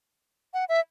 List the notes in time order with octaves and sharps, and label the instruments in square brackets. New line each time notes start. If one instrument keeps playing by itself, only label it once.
[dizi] F#5
E5